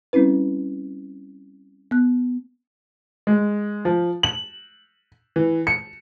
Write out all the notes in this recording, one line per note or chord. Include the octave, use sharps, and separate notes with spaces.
G3 C4 C#4 E4 B4
B3 F#6
G#3
F3
F#7
E3
C#7